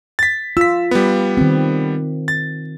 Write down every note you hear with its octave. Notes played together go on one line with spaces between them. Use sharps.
A6 B6
F4 E6 B6
G3 B3
D#3 C4
A6